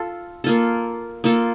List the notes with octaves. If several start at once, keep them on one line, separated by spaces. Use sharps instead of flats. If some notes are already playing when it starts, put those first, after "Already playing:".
Already playing: F4 A4
A#3 F4 A4
A#3 F4 A4